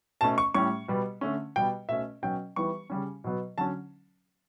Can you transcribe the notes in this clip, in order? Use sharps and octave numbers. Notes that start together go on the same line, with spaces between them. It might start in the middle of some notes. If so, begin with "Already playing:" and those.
B2 A3 C#4 A5
C#6
A2 G3 C#4 C#6
B2 G3 B3
D3 A3 C#4
B2 G3 B3 G5
B2 A3 C#4 E5
B2 F#3 C#4 G5
E3 G3 B3 C#6
C#3 G3 C#4
B2 F#3 B3
D3 F#3 C#4 A5